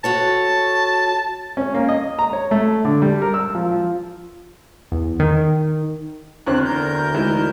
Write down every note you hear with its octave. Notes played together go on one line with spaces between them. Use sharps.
F#4 A4 C#5 A5
C#4
A#3
D#5
A#5
C#5
A3
D3
G3
A#4
E6
F3
F3
E2
D#3
E2 D3 C4 F#6
D2 A#4 G6
D#3 E3 G#3